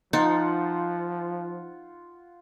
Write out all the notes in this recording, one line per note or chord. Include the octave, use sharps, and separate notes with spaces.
F3 D#4 F4 C5 F#5